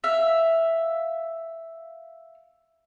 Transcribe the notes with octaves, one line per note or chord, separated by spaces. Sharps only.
E5 F5